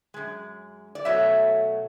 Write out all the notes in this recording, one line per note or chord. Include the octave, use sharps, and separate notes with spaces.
F#2 C#3 G#3
D5
B2 F#3 A3 C#5 E5